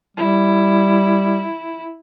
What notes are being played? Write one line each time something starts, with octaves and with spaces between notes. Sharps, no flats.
G3 E4